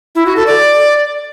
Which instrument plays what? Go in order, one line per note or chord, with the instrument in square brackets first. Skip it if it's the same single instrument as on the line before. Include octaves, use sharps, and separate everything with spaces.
[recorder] E4
F#4
A4
D5